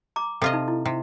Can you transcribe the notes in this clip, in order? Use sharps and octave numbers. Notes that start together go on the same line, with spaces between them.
A#5 D6
C3 F4 A4 D#5
D#4
E4
C3